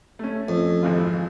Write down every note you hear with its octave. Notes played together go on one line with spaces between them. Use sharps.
A3 C#4
F2
G#1 E3 F4